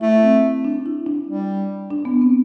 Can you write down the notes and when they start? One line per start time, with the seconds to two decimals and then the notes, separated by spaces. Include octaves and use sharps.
0.01 A3 E4
0.22 C4
0.65 D4
0.86 E4
1.07 D4
1.27 G3
1.90 D4
2.05 B3
2.22 C4